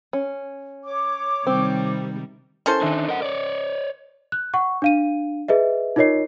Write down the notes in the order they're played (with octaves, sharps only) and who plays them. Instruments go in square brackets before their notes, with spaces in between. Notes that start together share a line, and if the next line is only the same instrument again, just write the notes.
[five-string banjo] C#4
[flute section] C#5 D6
[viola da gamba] C3 D#3 G3 [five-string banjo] C4
[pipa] C#4 A4 C5 [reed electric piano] E4 A#4
[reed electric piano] D#3 E5 G#5 [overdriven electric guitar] D4 D#4
[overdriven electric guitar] A#4 F#5 [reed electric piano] D#5
[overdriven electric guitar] C#5 D5
[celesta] F#6
F#5 C#6
D4 F5 D#7
G#4 B4 D#5 E5
D#4 F4 A#4 C#5 D#5 C7